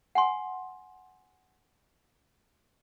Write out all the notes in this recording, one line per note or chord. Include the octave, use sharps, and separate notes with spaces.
F#5 G#5 C6